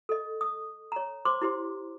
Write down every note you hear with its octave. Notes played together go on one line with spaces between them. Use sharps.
A4 D#5
D#6
C#5 A#5
C5 C6 D6
E4 G4 C5